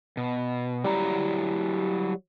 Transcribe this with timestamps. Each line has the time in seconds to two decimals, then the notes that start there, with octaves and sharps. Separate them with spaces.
0.17 B2
0.84 F#3 G3 E4 A#5